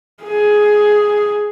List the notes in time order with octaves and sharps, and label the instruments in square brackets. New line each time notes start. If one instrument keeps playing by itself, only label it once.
[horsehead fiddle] G#4